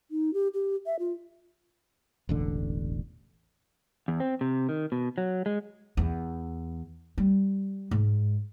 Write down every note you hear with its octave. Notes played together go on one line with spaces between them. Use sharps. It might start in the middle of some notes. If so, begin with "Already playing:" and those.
D#4
G4
G4
E5
F4
E1 A1 D3
E2
C4
C3
D#3
B2
F#3
G#3
E2
G3
G#2